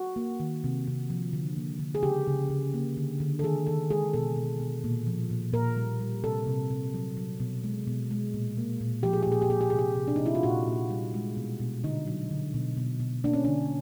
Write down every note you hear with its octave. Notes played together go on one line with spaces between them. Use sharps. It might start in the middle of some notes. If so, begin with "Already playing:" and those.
Already playing: F#4
A#3
D#3
C3
C3
F3
D3
A#3
D3
G#4
C#3 G4
C#3
C#3
A#3
D3
D3
A4
D#3 G#4
D#3 A4
G#3 G#4
B2 A4
B2
B2
A#2
F3
A#2
A#2 A#4
G3
G3
C3 A4
C3
C3
F#3
F#3
B2
G#3
B2
G#3
A#2
A#3
A#2
F3 G4
G#4
A#2 G4
G#4
G4
A#2 G#4
G4
C3 G#4
G4
C3
D4
C3 D#4
E4
F4
A#2 F#4
A#2
G3
G#3
B2
B2
D3 D#4
F#3
D3
B2
B2
B2
A#3 D4
C#4
D3 D4